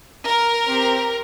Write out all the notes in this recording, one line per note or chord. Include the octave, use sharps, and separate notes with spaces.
A#4
C4 G4